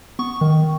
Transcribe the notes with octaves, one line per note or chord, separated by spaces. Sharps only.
B3 C#6
D#3